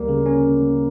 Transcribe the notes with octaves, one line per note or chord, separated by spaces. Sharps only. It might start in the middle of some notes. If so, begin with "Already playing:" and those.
Already playing: D2 G3 A#3
C#3
C#4